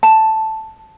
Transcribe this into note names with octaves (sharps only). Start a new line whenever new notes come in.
A5